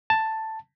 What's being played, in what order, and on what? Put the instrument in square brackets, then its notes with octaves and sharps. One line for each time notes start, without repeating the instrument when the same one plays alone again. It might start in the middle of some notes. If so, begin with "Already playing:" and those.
[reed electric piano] A5